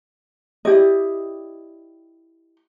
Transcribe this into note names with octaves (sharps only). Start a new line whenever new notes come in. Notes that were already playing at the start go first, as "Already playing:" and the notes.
E4 G4 D5 D#5